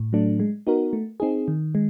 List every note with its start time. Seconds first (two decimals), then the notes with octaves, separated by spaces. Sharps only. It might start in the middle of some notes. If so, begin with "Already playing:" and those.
Already playing: A2
0.13 F#3 A3 D4
0.40 G#3
0.67 B3 D#4 F#4 A#4
0.93 A3
1.20 C4 D#4 G#4
1.48 D#3
1.75 G#3